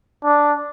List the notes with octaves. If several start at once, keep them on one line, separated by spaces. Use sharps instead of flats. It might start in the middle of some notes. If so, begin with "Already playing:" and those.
D4